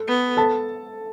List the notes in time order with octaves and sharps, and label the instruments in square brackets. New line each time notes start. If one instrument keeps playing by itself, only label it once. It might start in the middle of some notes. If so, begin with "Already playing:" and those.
Already playing: [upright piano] A4
[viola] B3
[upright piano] A4 A5